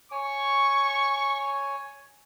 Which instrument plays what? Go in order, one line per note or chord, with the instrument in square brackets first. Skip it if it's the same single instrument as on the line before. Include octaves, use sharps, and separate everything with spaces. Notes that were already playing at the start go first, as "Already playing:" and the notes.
[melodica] C#5 G#5 [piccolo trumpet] C#6